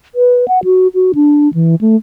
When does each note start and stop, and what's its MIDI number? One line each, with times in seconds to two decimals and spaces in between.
0.15 0.48 71
0.48 0.63 78
0.64 0.88 66
0.94 1.12 66
1.15 1.52 62
1.54 1.75 52
1.81 1.96 57